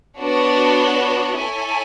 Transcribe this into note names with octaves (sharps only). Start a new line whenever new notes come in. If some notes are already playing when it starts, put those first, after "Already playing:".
B3 D4 F#4 C#5
E4 A4 C#5 G#5